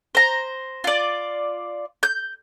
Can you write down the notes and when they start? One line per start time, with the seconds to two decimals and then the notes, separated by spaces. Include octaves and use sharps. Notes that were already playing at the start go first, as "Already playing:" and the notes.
0.15 C5 A#5
0.84 F4 D5
2.03 G6